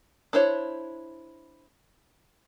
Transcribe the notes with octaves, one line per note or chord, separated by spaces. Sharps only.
D4 E4 C5 C#5